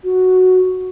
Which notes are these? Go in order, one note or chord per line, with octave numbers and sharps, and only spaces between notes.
F#4